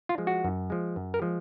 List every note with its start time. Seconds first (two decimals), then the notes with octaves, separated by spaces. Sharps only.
0.09 F4
0.18 F3 G#3
0.27 F#4
0.44 F#2
0.70 F3 G#3
0.96 F#2
1.14 A#4
1.22 F3 G#3